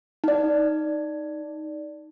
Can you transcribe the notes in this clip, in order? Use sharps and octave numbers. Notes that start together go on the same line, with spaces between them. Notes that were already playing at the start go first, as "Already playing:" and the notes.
D#4 D5